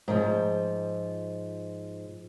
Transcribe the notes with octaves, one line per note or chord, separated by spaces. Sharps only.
G#2 F3